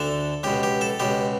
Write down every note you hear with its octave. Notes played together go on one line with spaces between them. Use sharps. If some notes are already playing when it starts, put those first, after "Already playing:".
Already playing: D2 D3 A4
C#2 B2 G4
G4
A4
C#2 B2 G4